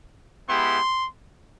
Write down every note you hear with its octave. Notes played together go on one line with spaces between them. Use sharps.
G#3 B3 E4 G4 C6